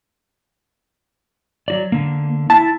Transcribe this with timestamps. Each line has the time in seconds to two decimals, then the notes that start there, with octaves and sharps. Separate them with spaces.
1.68 F#3 F#4 D5
1.92 D3 A#3
2.50 E4 A5